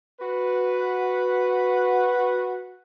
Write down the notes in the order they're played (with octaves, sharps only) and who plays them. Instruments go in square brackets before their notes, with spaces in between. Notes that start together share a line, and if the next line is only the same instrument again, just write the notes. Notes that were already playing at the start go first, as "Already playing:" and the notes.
[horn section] F#4 B4